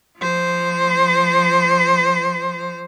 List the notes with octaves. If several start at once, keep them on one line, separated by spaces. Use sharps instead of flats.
F3 C5